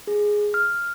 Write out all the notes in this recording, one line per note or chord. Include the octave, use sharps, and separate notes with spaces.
G#4
F6